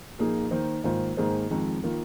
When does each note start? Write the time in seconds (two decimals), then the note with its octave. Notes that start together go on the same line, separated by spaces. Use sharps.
0.19 A#2 F3 A#3 D#4 G#4
0.51 D#3 A#3 D#4 C5
0.84 G#2 D#3 A#3 F4 C5
1.17 G#2 D#3 A#3 G#4 C5
1.50 F2 D#3 G#3
1.84 D#3 A#3 F4 A#4